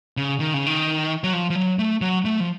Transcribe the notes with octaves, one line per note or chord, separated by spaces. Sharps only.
C#3
D#3
C#3
D#3
F#3
F3
F3
F#3
A3
F#3
A3
F3